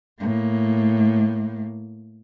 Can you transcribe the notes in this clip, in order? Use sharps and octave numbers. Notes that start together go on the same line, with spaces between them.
A2 A#3